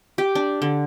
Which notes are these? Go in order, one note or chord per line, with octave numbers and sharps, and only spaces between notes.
G4
D4
D3